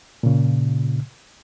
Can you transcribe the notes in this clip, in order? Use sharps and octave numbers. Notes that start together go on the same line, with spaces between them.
A#2 C#3